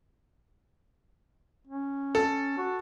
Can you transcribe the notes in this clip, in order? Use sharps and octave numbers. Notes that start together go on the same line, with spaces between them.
C#4
A4
F#4